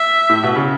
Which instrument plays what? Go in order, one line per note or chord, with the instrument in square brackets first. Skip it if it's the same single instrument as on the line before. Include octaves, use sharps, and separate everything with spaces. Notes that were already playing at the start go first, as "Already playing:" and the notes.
Already playing: [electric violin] E5
[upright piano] A2
B2
C#3